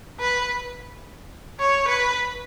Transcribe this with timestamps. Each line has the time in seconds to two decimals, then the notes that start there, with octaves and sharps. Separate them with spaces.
0.20 B4
1.60 C#5
1.88 B4